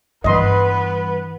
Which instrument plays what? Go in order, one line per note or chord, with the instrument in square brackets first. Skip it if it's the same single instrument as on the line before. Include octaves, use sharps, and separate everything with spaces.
[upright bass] G2 E3 [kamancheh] B3 B4 [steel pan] D#5 C6